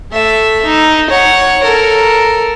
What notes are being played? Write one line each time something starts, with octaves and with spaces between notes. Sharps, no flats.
A3 E5
D#4
C#5 F#5
A4 A#4